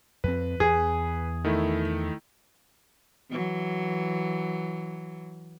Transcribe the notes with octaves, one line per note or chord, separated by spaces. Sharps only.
F2 C4 B4
E2 G#4
D#3 A3 E4
E3 F#3